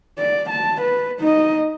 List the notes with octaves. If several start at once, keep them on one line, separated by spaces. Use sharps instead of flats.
D5
A5
B4
D#4 D#5